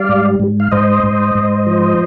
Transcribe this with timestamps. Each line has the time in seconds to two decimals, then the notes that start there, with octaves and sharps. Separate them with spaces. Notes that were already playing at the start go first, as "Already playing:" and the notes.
Already playing: G3 D5 F5
0.09 G#2
0.40 G#2
0.60 F5
0.72 G#2 C5 D#5
1.03 G#2
1.35 G#2
1.67 F3